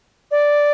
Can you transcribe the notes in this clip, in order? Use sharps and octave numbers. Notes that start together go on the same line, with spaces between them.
D5